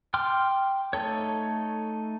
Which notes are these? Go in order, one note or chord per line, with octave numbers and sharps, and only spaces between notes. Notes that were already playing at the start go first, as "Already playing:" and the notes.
G5 C6 D6 F6
A3 D#4 A4 C#5